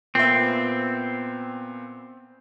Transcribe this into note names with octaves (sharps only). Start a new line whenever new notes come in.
A#2 B3 C4 E5